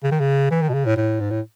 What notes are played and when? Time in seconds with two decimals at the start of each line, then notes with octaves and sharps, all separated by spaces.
0.03 C#3
0.11 D#3
0.20 C#3
0.50 E3
0.62 D#3
0.69 B2
0.74 C#3
0.85 A2
0.97 A2
1.20 G#2
1.30 A2